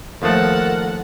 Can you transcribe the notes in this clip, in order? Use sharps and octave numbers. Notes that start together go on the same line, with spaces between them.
D#2 F3 A3 A4 A#4 F#5